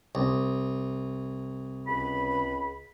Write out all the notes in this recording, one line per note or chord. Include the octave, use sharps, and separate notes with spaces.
C2
C#2 B5